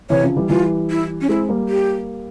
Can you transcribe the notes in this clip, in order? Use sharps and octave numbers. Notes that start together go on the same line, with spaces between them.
C3 E3 C#5
C#3 F3
E3 G3
E3 G3 F4
E4
C#4
G#3 C4 E4
G3 A#3
G4